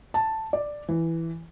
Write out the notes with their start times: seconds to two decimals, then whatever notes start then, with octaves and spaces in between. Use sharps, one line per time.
0.14 A5
0.53 D5
0.88 E3